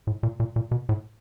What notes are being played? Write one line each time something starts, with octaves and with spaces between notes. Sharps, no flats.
A2
A#2
A#2
A#2
B2
A2